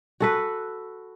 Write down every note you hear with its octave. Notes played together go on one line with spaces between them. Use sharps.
F#4 A4 B4